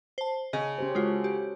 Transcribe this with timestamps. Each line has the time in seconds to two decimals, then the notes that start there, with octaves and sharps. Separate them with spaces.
0.18 C5 A5
0.53 C#3 D#5
0.78 C#4 G4 C5
0.95 G#3 F4 F#4 A4 F#5
1.24 G4